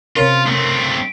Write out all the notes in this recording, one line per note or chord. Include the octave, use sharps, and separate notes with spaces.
C3 C#4 F4 A#4
A3 C4